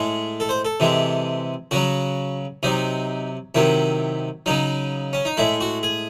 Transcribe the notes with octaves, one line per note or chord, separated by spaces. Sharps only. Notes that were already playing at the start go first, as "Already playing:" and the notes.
Already playing: A2 G#3
A4
C5
A4
C3 E3 G#3
C#3 F#3 F#4
C3 F#3 D#4
C3 D#3 F#3 E4
C#3 F#3 D#4
C#4
D#4
A2 G#3 E4
F#4
G#4